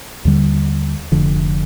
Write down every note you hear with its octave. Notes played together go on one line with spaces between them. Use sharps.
D#2 D3 G3
F1 F2 D3